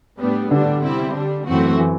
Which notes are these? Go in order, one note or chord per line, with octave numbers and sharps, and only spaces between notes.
A2 G3 B3 D4
A2 D3 G3 D4
C3 G3 C4 E4
D3 G3 D4
F#2 E3 A3 C4 F#4
E3